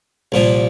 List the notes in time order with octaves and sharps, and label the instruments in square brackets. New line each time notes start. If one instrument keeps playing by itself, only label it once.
[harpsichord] C2 A#2 F3